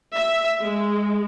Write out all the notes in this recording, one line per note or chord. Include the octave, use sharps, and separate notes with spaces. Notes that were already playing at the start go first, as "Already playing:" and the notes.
E5
G#3